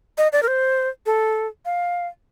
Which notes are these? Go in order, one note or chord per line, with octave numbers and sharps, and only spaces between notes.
D#5
D5
A#4
C5
A4
F5